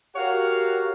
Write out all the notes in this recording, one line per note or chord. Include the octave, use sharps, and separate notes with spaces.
F#4 G4 A#4 C#5 F5 F#5